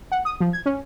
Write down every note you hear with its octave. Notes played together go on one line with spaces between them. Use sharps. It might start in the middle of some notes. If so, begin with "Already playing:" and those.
F#5
D#6
F3
G#6
C#4